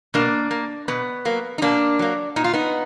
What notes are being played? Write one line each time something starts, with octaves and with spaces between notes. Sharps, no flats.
B2 A#3 D4
A#3
B2 B3
F#3 A#3
D#4
B2 A#3 D4
F#3 A#3
A#2 D#4
F4
B3 D#4